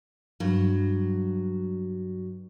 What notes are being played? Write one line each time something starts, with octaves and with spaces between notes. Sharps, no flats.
G2 F#3